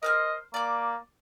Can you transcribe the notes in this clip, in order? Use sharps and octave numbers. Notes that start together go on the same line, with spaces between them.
A#4 C5 D#5 F6
A#3 D5 D6